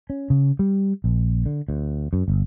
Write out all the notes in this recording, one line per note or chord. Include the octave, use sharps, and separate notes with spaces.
C#4
C#3
G3
A#1
D3
D2
F#2
G1